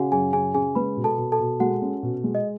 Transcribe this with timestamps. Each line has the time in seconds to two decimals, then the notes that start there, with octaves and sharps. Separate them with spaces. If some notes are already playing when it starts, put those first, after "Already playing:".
Already playing: C#3 F#4 G#4 F#5 G#5
0.12 F#2 G#4 G#5
0.33 C#3 G#4 G#5
0.54 C#3 G#4 G#5
0.75 G#3 B4 B5
0.97 B2
1.04 A4 A5
1.18 B2
1.32 A4 A5
1.40 B2
1.60 G#3 F#4 F#5
1.82 C#4
2.03 B2
2.24 G#3
2.35 D#5